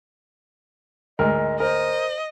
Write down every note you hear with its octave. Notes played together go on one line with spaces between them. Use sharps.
D2 G#2 A#4 D#5
A#4 C5 D#5